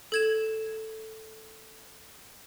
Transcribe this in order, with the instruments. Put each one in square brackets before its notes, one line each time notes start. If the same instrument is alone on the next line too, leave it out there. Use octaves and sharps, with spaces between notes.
[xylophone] A4 G#6 E7